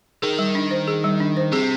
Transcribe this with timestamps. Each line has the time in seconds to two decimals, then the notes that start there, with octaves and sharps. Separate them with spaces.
0.22 D#3 G#4
0.39 G3
0.55 D4
0.71 C5
0.88 G#4
1.04 G3
1.20 D4
1.37 C5
1.52 C3 G#4